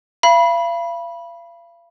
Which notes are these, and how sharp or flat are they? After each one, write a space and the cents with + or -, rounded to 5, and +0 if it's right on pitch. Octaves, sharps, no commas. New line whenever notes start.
F5 -40 B5 -20